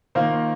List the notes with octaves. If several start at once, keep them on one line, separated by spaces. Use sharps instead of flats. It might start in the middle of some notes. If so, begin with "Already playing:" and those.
D#3 A#3 F4 C5